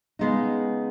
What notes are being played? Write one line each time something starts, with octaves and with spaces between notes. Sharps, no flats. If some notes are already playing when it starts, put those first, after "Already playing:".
C#3 G#3 B3 D#4